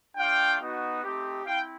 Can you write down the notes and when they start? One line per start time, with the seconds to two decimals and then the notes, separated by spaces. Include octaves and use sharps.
0.17 A3 D4 F4 F5 G5
0.60 B3 D#4 F#4
1.03 A3 C4 D#4 G4
1.45 C4 E4 F5 G5